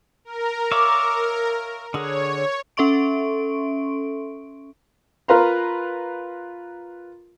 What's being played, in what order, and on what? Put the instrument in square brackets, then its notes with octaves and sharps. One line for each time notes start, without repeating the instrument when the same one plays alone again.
[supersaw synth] A#4
[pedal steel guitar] C#5 E5 F5 [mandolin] D5 D6 E6
[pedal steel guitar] D3 G#4 [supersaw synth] C#5 [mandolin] F#5
[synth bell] C#4 A4 E5 C6 C#6 D7
[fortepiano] F4 A#4 B4 F5 A#5 C6